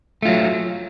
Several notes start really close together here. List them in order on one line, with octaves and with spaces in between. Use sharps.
A3 F4 F#3